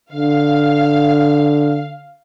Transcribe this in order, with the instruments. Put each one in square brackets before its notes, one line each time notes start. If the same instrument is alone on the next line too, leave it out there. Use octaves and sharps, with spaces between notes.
[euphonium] D3 [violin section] F5